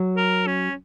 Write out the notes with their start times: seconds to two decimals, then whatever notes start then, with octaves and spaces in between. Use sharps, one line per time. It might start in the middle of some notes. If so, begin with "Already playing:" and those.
Already playing: F#3
0.17 A#4
0.47 C#4